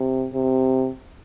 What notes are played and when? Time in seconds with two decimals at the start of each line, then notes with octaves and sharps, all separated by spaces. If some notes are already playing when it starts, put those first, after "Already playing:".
Already playing: C3
0.33 C3